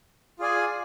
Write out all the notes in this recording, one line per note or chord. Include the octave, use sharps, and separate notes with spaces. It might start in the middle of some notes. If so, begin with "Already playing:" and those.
F4 G#4 D5 G#5